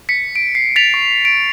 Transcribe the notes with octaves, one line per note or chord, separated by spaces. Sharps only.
B6 C#7
D7
C7
A6 B6 F7
C#6
D7